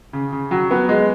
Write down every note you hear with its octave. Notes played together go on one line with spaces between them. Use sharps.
C#3
C#3
F#3
B3
G#3